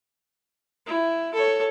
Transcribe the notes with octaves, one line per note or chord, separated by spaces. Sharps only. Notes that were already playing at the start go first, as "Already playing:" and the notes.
E4
A4 C#5